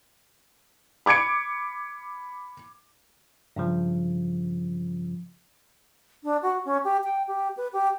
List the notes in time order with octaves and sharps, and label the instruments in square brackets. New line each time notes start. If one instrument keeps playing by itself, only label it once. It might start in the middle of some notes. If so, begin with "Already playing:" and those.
[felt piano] B5 D6 G#6 C#7 D7
[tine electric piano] G2 C#3 F3
[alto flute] D4
F#4
C#4
G4
G5
G4
B4
G4